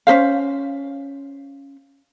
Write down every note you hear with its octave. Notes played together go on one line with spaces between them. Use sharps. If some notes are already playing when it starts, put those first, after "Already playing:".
C#4 D#4 C5 F5